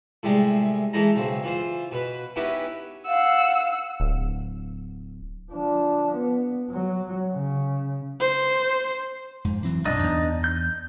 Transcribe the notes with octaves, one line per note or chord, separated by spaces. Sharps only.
A2 C3 G3 G#3
E3 G#3 A3 D#4 E4 A#5
B1 C#3 C4
E3 F4 C5
B2 B4
B3 C#4 D#4 E4 G4 B4
F5 F#5 E6
D1
F3 D4
B3
F#3
C#3
C5
F2 G#2
E3 F#3 C4
B1 F#2 A2 D4 D#4 D#5
E2 B3
G6